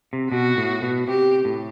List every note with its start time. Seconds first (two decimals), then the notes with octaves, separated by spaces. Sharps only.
0.13 C3
0.31 B2 F#4
0.57 A2
0.82 B2
1.07 C3 G4
1.45 A2